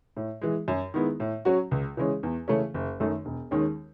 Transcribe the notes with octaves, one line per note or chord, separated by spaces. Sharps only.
A2
E3 G#3
F#2
D#3 G#3 B3 E4
A2
F#3 C#4 F#4
C#2
C#3 E3 G#3 C#4
E2
C#3 E3 A3 C#4
F#1
F#2 D#3 A3
E1
D#2 D#3 G#3 C#4